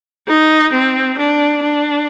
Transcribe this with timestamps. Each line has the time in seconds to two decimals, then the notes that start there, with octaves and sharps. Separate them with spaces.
0.28 D#4
0.73 C4
1.18 D4
1.63 D4